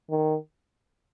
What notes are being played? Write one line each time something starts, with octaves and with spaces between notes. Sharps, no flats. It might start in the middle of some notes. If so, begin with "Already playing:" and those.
D#3